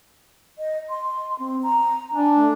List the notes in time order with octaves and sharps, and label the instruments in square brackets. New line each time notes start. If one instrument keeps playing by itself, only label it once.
[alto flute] D#5
C6
C4
A#5
[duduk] D4 [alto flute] G#5
[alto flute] A3